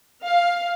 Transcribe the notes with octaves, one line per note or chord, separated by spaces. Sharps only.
F5